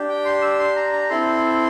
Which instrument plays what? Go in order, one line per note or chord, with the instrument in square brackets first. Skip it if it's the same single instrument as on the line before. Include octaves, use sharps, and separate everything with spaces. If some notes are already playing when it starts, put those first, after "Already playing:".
Already playing: [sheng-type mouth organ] D4 G4
G5
C6
E6
C6
A#5
A#5
C4 E4 A4 C6